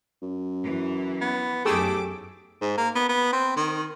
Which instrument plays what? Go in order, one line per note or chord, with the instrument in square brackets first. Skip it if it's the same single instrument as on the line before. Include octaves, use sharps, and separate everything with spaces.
[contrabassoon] F#2
[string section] E3
[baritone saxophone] B3
[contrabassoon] B1 [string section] F#2 D6 [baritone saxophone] A3 [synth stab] G4 G#4 E6
[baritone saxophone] G#2
A#3
B3
B3
C4
D#3